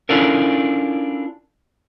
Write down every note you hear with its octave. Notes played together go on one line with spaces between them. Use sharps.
C#4 D4 E4 F4 A4 A#4